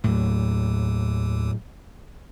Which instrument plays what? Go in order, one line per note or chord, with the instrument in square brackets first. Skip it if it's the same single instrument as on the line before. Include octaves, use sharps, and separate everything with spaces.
[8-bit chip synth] D#2 [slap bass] A2 F#3